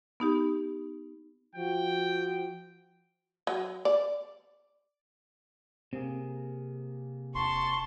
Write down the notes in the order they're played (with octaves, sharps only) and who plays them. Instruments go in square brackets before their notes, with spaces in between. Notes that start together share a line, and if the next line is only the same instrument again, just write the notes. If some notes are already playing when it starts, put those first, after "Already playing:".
[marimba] B3 D#4 G4
[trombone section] F3 F#4 [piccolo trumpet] G5
[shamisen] F#3
D5
[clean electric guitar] C3 A#3 G#4 [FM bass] C4
[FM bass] E1 [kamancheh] A5 C#6 [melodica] C6